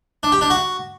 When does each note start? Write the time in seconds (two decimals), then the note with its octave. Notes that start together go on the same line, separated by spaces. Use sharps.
0.23 D4
0.32 G4
0.41 D4
0.50 F#4